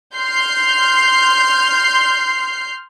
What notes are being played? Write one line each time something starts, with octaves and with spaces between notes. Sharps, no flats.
C6 F6 G6 C7